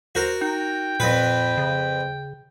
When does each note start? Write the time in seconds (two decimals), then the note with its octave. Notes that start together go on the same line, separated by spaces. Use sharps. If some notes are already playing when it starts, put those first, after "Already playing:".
0.15 F#4 A#4 C5
0.42 D#4 G5
1.00 F2 A#2 B4
1.57 C#3